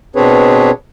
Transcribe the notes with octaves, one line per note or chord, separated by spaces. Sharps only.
B2 C4 D4 G#4 B4 C#5